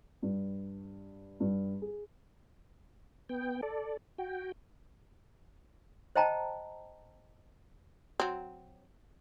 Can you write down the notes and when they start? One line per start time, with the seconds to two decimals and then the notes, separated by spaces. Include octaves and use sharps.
0.22 G2
1.40 G2
1.82 G#4
3.29 B3 G5
3.63 A4 D5
4.18 F#4 G5
6.16 C5 D#5 G5 A5 A#5
8.20 F#3 C4